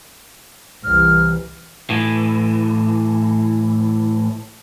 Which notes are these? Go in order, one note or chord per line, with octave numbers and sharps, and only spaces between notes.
C2 E3 F6
A2 E3